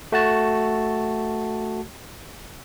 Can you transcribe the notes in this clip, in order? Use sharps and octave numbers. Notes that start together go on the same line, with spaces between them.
A3 F#4 A5